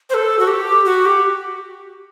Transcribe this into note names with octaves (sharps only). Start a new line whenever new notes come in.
C5
A4
F#4
G4
F#4
G4